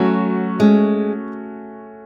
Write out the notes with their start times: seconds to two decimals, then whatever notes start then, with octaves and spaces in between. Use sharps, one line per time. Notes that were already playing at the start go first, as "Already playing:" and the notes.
Already playing: F#3 A3 C#4 F#4
0.59 G#3 A3 C#4 F#4